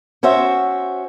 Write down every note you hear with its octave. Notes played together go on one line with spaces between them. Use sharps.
C#4 F#4 C5 E5